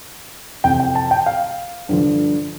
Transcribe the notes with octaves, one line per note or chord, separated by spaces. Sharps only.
F2 C3 E3 G5
G5
A5
G5
F5
G2 D3 F3